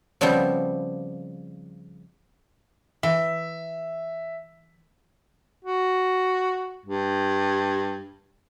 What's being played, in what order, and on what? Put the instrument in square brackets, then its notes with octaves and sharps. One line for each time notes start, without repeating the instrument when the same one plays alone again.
[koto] C#3 F3 G3 B3 C4
[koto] E3 [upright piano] E5
[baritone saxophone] F#4
G2